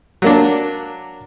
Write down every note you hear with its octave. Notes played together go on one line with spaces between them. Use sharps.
F#3 A#3 D4